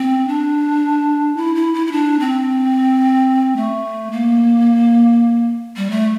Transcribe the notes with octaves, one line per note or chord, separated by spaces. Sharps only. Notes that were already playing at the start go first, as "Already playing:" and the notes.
Already playing: C4
D4
E4
E4
E4
E4
D4
C4
A3
A#3
G3
A3